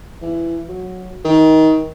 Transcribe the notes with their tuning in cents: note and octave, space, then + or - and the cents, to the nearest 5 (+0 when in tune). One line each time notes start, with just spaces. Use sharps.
E3 +20
F#3 -10
D#3 +25